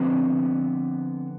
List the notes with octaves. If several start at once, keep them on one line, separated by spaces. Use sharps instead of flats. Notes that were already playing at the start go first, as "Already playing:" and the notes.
Already playing: D3 F3 B3 C4